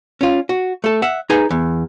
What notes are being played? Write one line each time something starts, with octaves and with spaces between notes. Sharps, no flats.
C#4 F4
F#4
A3 A4
E5 F#5
D#4 G#4 B4 G#5 A#5
E2